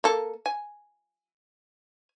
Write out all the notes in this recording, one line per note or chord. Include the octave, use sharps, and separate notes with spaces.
A#3 A4
G#5